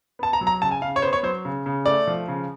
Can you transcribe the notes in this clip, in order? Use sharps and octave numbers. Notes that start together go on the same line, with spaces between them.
B3 A5
A#5
F#3
A#5
C#3 A5
G#5
C#3 F5
C#5
B3 C5
C#5
F#3 C5
C#3
C#3
A3 D5
F3
C#3